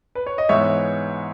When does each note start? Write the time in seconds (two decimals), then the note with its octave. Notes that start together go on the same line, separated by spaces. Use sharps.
0.15 B4
0.27 C#5
0.38 D#5
0.49 G#2 E3 G#3 B3 C#5 E5